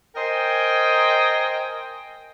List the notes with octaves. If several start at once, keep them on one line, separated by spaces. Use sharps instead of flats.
A#4 C5 D#5 G5 G#5